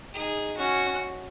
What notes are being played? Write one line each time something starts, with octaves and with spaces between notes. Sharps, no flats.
D#4 G#4
C#4 F#4